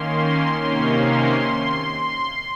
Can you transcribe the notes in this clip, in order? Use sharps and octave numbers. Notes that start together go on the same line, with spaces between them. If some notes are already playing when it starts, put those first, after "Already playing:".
Already playing: D#3 A#3 C#4 C6
C3 D#3 A#3 C#4
C6